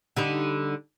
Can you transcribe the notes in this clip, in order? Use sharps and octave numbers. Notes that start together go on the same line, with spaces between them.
D3 G3 D#4